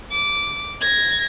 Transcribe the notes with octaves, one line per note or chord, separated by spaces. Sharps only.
D6
G#6 A#6